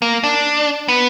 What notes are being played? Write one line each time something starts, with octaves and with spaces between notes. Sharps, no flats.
A#3
D4
B3